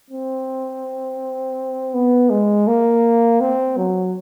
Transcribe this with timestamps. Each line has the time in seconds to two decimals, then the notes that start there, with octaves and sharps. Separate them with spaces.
0.10 C4
1.94 B3
2.30 G#3
2.67 A#3
3.41 C4
3.77 F#3